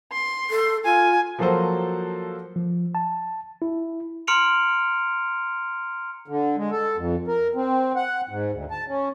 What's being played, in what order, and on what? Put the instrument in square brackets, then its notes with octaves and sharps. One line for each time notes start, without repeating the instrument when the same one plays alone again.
[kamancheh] C6
[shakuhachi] A4
[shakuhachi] F4 [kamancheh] G#5
[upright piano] F3 F#3 A#3 F#4 A4 C5
[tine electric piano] F3
A5
E4
[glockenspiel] A#5 C6 F6 C#7 D7 F7
[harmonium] D3
G#3
A4
F2
A#4
C4
F#5
G#2
D2
A5
C#4